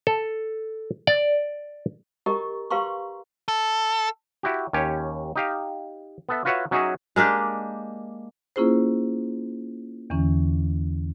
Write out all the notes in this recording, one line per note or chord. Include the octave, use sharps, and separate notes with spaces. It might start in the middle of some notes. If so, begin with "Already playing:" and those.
A4
D5
G4 A#4 D#5 A#5 C#6
G4 B4 F5 A#5 C6 C#6
A4
E4 F#4 G4
D#2 C#4 G4 C#5
D#4 G4 F5
B3 A4 E5
F4 F#4 B4 C#5 E5 F#5
F#3 C#4 D#4 F#4 G#4 E5
G#3 A#3 D4 G4
A#3 C#4 E4 F4 G#4 C5
E2 D3 E3 C#4